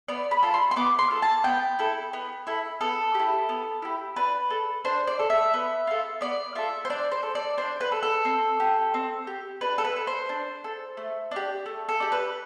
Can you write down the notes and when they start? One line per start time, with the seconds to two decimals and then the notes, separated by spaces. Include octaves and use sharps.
0.08 B3 D5
0.31 B5
0.43 F4 A4
0.54 C6
0.71 C6
0.76 B3 D6
0.99 C6
1.11 F4 A4
1.22 A5
1.44 B3 G5
1.79 E4 A4
2.13 B3
2.47 E4 A4
2.81 B3 A4
3.14 G4
3.19 E4
3.49 B3
3.82 E4 G4
4.16 D4 B4
4.50 A4
4.85 D4 C5
5.07 D5
5.19 A4
5.30 E5
5.54 B3
5.87 F4 A4
6.21 B3 D5
6.55 F4 A4 E5
6.85 C5
6.90 D4 D5
7.11 C5
7.23 A4
7.35 D5
7.58 D4 C5
7.81 B4
7.92 A4
8.03 A4
8.25 C4
8.60 G4
8.94 C4
9.27 G4
9.61 D4 B4
9.78 A4
9.84 B4
9.96 A4
10.07 C5
10.29 D4
10.64 A4
10.97 A3
11.31 D4 G4
11.66 A3
11.89 A4
12.00 D4 G4
12.12 B4